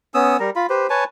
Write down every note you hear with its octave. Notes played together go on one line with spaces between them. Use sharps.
B3 C#4 D#6 E6
G3 A#4
F4 B5
G4 B4 C5
B4 C#5 G#5 A5